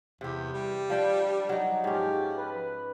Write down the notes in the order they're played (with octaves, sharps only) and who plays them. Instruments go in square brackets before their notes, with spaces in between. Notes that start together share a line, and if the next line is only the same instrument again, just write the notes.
[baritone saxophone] E2 [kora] C3 G4
[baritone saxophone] G3
[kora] F3 D4 G5
F#3 D#4
[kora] G#2 C#4 [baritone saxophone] F3 [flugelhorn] G4
[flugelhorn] B4